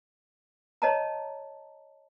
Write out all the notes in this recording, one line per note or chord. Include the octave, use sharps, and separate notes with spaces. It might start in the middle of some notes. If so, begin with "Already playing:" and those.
C#5 D#5 A5 A#5